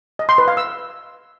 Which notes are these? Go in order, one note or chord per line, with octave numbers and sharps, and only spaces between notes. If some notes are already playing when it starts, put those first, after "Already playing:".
D#5
C6
B4
F5
E6